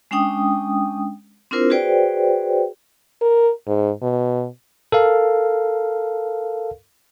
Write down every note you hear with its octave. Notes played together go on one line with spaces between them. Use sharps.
G#3 C#4 D4 G5 D#6
C4 D4 E4 F4 A#4 C5
F#4 G#4 B4 C5 D5 G5
A#4
G#2
B2
A4 A#4 F5